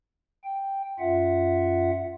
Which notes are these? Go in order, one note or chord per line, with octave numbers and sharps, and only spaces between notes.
G5
F#2 F4 E5 F#5